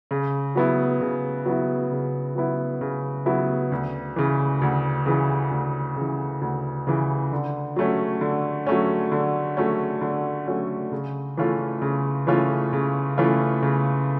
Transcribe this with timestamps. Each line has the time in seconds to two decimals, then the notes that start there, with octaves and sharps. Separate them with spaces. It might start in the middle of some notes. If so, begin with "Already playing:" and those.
0.11 C#3
0.55 F#3 B3 E4
1.01 C#3
1.45 F#3 B3 E4
1.91 C#3
2.35 F#3 B3 E4
2.81 C#3
3.26 F#3 B3 E4
3.72 D2
4.16 C#3 E3
4.62 D2
5.06 C#3 E3
5.51 D2
5.96 C#3 E3
6.42 D2
6.87 C#3 E3
7.32 D3
7.76 F#3 A3 C#4
8.21 D3
8.67 F#3 A3 C#4
9.12 D3
9.57 F#3 A3 C#4
10.01 D3
10.47 F#3 A3 C#4
10.92 C#3
11.37 E3 A3 C#4 F4
11.82 C#3
12.27 E3 A3 C#4 F4
12.73 C#3
13.18 E3 A3 C#4 F4
13.63 C#3